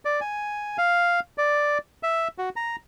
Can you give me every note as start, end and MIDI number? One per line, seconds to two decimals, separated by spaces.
0.05 0.20 74
0.21 0.77 80
0.78 1.20 77
1.38 1.78 74
2.03 2.28 76
2.38 2.49 66
2.56 2.76 82